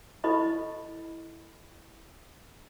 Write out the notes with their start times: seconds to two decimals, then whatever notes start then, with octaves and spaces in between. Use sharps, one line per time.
0.24 E4 A4 D#5 B5 C#6